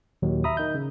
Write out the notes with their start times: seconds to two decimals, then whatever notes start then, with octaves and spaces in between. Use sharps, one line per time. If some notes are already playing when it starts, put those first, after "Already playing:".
0.22 D#2 A#2 D#3 F#3
0.44 E5 A#5 B5 D#6
0.57 D#3 D#5 G6
0.75 C#3